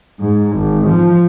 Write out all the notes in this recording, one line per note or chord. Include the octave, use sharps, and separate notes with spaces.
G#2
G#1
F3